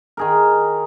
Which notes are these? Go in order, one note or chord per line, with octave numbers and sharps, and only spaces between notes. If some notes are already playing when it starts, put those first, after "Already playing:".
D#3 G#4 A#4